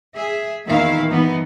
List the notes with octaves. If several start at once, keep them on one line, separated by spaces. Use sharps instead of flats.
G#4 E5
E2 A#2 D#3 E4 E5 F5
G2 E3 B3 D#4